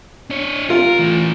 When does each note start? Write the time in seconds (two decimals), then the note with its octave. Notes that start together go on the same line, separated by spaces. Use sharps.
0.30 D4 C#5
0.70 F4 A#4
0.99 E3 A3